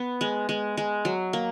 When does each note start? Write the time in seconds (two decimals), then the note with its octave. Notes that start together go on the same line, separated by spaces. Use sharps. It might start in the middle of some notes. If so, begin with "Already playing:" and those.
Already playing: B3
0.21 G#3
0.49 G#3
0.77 G#3
1.05 F#3
1.33 A#3